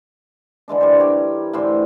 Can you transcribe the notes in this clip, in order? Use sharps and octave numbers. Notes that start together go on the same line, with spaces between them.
D3 E3 G#3 D4
G3 A#4 C5
G4 C#5
A2 D3 E3 C5